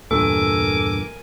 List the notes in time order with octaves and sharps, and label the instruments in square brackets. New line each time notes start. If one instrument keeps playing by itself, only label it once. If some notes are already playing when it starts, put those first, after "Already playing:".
[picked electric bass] E2 G2 A#2 [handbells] A4 [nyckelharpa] A#4 G#5 [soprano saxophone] D6